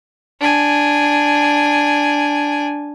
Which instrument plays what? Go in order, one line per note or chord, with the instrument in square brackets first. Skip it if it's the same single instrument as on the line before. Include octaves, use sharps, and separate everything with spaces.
[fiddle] D4 G#5